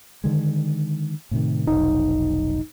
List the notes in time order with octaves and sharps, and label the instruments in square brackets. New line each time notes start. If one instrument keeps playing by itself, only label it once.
[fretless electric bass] D3 D#3 G#3
A2 C3 D#3
[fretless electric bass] F1 B1 [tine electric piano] D#4